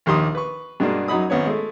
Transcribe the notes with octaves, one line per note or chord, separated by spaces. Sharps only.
A#1 D#2 G4 C6 D#6
B4 C#6
G2 B2 G#3 A#3 D4
F#2 F#3 D#4 B5 D#6
G#1 B3 C#4 C#5
G#3 A3